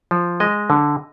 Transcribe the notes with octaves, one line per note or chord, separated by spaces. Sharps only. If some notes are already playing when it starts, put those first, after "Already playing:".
F3
G#3 D#5
D3